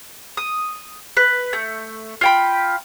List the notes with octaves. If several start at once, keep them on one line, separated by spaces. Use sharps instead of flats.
D#6
B4
A3 G6
F4 G5 B5